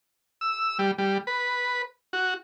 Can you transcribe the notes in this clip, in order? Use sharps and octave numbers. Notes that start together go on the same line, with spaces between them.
E6
G3
G3
B4
F#4